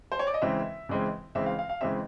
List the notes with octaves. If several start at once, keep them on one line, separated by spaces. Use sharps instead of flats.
C5
C#5
D5
D#5
C#3 E3 G#3 C4 E5
C#3 E3 G#3 C4
C#3 E3 G#3 C4 E5
F5
F5
F5
C#3 E3 G#3 C4 E5